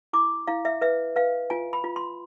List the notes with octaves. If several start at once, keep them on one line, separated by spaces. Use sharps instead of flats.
E4 D6
E4 F5
E5
B4 E5
B4 F5
F4 G#5
B5
F4
C6